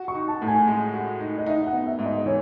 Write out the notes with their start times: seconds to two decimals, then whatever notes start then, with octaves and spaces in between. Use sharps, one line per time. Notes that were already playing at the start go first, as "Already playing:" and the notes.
Already playing: F#4
0.08 C#6
0.15 D#4
0.28 A5
0.42 A2
0.47 G#5
0.67 G#3
0.94 F#4
1.20 D#4
1.38 D#5
1.46 D#4 E5
1.66 F#5
1.73 B3
1.87 E5
1.99 G#2
2.06 D#5
2.25 E3 C#5